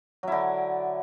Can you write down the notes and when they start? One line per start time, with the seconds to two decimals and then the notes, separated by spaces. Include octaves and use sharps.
0.23 F#3
0.28 E4
0.32 D3